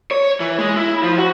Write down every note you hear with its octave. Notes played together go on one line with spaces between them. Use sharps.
C#5
E3
G#3
E4
F3
F#4